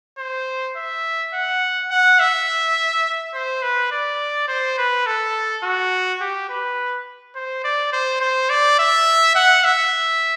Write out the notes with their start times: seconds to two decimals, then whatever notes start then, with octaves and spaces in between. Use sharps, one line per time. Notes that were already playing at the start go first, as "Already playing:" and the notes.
0.18 C5
0.76 E5
1.34 F#5
1.91 F#5
2.20 E5
3.34 C5
3.62 B4
3.92 D5
4.48 C5
4.78 B4
5.07 A4
5.64 F#4
6.21 G4
6.50 B4
7.36 C5
7.64 D5
7.93 C5
8.21 C5
8.50 D5
8.79 E5
9.36 F#5
9.64 E5